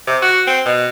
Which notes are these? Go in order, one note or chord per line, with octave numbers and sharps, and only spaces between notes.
C3
F#4
C4
B2